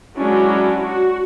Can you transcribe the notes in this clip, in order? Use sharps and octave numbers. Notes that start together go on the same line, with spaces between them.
F#3 G#3 C#4 D4 E4 F#4
F#4